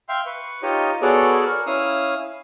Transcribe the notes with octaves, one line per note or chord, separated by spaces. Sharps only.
E5 F5 G5 C6
B4 C#6
D#4 F4 G4 C#5 D#5
B3 F#4 G#4 A4 C#5 D5
A#4
C#4 E4 F5 D#6 E6